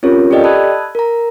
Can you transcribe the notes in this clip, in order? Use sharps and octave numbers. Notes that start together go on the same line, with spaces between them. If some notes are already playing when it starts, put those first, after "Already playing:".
C4 C#4 F4 G4 A#4 C#5
G4 A4 D5 D#5 G5
A5 B5 D#6 E6 F#6 G#6
A#4 A#5